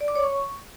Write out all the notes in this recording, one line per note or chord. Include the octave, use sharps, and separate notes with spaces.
D5
D6
C#5
C#6